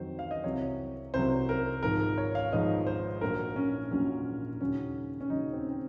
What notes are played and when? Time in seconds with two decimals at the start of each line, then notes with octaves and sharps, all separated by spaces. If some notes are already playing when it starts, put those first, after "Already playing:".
Already playing: F2 D#3 F#3 C5
0.19 F5
0.31 D#5
0.44 C2 C3 F#3 C#5
1.14 C2 C3 F#3 C5
1.49 A#4
1.83 G#1 G#2 F3 A#4
2.18 C#5
2.35 F5
2.52 G#1 G#2 F3 D#5
2.87 C5
3.21 A#1 A#2 F#3 A#4
3.56 C#4
3.91 A#1 A#2 F#3 C#4
4.61 D#2 C#3 F#3 C#4
5.21 C#4
5.30 D#2 C#3 F#3 D#4
5.53 C4
5.70 C4